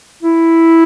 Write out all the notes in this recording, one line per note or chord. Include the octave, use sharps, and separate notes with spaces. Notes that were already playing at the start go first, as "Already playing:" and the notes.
E4